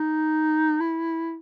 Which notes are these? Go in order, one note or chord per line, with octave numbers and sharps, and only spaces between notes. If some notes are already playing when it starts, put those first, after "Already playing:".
Already playing: D#4
E4